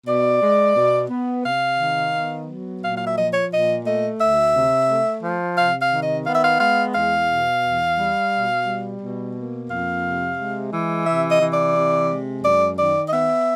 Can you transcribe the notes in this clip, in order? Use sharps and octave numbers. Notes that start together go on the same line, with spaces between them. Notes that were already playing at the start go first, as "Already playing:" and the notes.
B2 D5
G#3
B2
B3
C3 F5
D#3
B3
F#3
A#2 F5
F5
E5
F3 D#5
C#5
A#2 D#5
A3 D#5
D2 E5
C3
A3
F3
C3 F5
F5
D#3
D#5
B3 F5
E5
F5
G#3 F5
E2 F5
B2
E2
G3
B2
G3
B2
A#3
F2 F5
C3
G#3
E3
C3 E5
D#5
E3
D5
C3
G#3
F#2 D5
D#3 D5
D#5
B3 E5